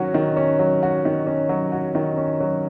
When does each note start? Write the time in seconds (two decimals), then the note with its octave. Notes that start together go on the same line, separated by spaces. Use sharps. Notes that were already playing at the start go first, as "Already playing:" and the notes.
Already playing: D#3 F#3 C#4 F#4
0.14 D#3
0.37 C#4
0.59 F#3
0.83 F#4
1.05 D#3
1.27 C#4
1.49 F#3
1.72 F#4
1.95 D#3
2.17 C#4
2.40 F#3